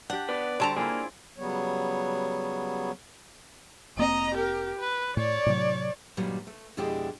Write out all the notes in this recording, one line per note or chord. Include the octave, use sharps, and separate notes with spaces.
D4 G4 F#5
B3 B4 D5
D3 F#3 G3 C4 D5 A5 A#5
A#3 E4 F4 G#4 D5 G#5
C#3 F#3 G3 B3 C#5
F1 A#3 C4 D#5 A#5
G4 A#4
B4
A2 C#5 D5
A2 C3 F#3
G2 A#2 D#3 F#3 G3
A3
F2 B2 G#3 D4 E4 G4